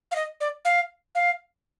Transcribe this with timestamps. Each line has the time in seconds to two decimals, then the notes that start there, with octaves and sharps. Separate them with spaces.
0.11 F5
0.15 D#5
0.40 D5
0.65 F5
1.15 F5